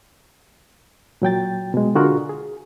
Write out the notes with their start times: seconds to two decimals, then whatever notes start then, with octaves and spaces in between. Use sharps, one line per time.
1.22 A#2 F#3 G5 A6
1.74 B2 G#3
1.95 D3 F4 F#4 G#4 A#4
2.29 G#4